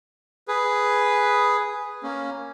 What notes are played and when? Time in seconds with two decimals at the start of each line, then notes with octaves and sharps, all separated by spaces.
0.48 G#4 B4
2.03 A#3 C#4